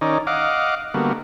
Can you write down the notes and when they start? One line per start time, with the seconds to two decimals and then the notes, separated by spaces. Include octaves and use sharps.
0.01 D#3 C#4 D#4 D5
0.27 D#5 F5 F#5 D6
0.94 D3 G3 A#3 B3 F#4